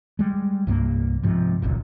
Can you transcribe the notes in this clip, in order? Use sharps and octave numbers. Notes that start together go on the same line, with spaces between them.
G3 G#3
C2 G2 G#3 A#3
G#2 C3 F3
D#1 G#1 C#2 A#2